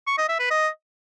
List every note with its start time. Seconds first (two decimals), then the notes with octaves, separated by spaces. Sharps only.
0.07 C#6
0.18 D#5
0.29 E5
0.39 B4
0.50 D#5